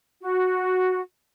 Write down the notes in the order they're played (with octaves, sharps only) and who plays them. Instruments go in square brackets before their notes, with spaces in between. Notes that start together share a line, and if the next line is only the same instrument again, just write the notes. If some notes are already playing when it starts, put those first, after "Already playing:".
[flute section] F#4